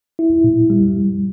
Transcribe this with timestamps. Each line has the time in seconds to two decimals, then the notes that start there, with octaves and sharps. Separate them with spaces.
0.19 E4
0.44 A#2
0.70 G3